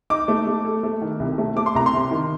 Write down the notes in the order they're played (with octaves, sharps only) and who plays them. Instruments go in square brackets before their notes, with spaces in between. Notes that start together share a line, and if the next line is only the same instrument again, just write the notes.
[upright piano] D#4 [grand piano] D6
[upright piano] A3
A3
A4
A3
D#3
C2
A3
[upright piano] A3 [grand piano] D6
[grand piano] C6
[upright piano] C2 [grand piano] A#5
[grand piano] C6
[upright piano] C3
D#3